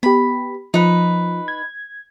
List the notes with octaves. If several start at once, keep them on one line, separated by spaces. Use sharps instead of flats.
B3 G4 B5
F3 D#4 B4
G#6